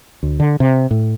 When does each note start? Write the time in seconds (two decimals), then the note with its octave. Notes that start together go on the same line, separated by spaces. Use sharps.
0.23 D2
0.40 D3
0.60 C3
0.91 A2